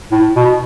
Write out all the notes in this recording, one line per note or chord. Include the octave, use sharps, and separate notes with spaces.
A2
B2